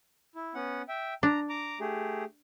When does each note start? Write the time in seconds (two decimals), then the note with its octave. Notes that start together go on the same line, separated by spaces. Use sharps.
0.35 E4
0.55 B3 C#4 F#5
0.89 E5 G5
1.23 D4 A#5
1.49 A#5 D6
1.80 A3 G4 G#4